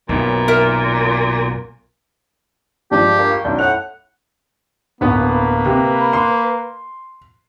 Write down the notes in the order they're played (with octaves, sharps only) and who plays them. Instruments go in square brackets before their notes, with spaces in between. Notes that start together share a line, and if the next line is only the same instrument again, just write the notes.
[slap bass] B1 F#2 [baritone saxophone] A#2
[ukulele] A#4 E5
[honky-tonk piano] G2 F3 G#3 [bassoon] D4 [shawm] G4
[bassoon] A#3
[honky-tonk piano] C#6
[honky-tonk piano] B1 F#2 G6 [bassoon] D4
[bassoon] A2 [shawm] F#5 [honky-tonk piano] F7
[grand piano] D1 B3 [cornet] A#3 [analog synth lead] B4
[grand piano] C3
C6